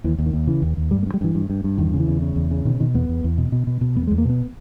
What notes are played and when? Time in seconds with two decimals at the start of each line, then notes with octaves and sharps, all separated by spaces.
0.04 D#2 E3
0.18 D#2
0.26 D#3
0.33 D#2
0.48 C#3 E3
0.62 D#2
0.77 D#2
0.91 G2 G3
1.03 A#3
1.06 G2
1.14 G3
1.21 G2 E3
1.35 G2
1.50 G2
1.64 G2
1.78 E2 D#3
1.94 C#3
2.00 E3
2.08 E2
2.22 C#3
2.36 E2
2.51 C#3
2.65 B2 D#3
2.80 B2 D#3
2.94 E2 B3
3.09 E2
3.24 E2
3.38 B2
3.52 B2
3.67 B2
3.81 B2
3.96 E2 B3
4.07 G#3
4.11 E2
4.18 A#3
4.25 B2 B3